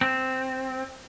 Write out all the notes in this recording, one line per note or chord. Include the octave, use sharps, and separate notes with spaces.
C4